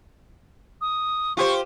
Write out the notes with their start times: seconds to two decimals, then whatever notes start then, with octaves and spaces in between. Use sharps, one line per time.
0.81 D#6
1.37 F4 G4 C5 C#6